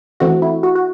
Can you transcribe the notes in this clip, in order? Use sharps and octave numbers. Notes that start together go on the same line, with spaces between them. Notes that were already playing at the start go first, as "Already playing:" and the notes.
E3 A3 C4 F#4
E4
F#4
F#4